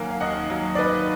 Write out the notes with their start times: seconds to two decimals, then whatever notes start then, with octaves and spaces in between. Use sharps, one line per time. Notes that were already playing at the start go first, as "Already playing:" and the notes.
Already playing: D#2 D#3 F#3 A#3 F5 F#5 G#5
0.10 F5
0.20 D#2 D#5 F#5
0.50 F#3
0.75 D5
0.78 D#3 B4 D#5